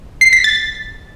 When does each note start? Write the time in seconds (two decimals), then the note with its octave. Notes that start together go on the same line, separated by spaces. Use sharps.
0.21 C7
0.33 B6
0.44 A6